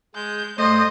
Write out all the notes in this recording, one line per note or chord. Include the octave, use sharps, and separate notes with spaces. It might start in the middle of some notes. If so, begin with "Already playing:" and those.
G#3 G6
G2 A3 C5 D#5 D#6 G6